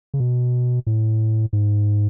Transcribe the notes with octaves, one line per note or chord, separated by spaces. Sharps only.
C#3
B2
A2
G#2